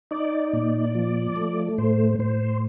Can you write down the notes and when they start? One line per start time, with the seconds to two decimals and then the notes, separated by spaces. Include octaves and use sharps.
0.11 D#4 D5
0.53 A#2
0.95 F3
1.36 A3
1.78 A2 C5
2.19 A2 C5